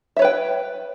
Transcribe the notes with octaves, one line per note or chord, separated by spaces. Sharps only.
B4 C#5 E5 G5